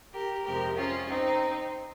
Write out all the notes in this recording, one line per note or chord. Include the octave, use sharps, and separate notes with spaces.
G4 A#4
F2 C3 F3 G#3 G4 A#4
C#4 F4
C4 D#4